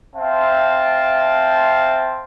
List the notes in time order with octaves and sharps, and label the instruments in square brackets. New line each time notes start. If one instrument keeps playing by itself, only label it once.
[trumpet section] C4 C5 E5 F5 A5